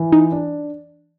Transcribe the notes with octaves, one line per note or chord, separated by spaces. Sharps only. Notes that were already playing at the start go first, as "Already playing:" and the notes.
Already playing: E3
D#4
D4